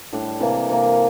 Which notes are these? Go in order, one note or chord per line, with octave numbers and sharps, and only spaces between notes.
A2 G3 D4
C3 E3 A#3
C3 E3 A#3